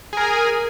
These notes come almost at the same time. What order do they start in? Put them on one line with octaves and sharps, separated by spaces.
G#4 A#4 G#5